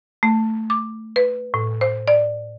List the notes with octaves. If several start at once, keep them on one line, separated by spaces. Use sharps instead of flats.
A3
D6
B4
A2
C5
D5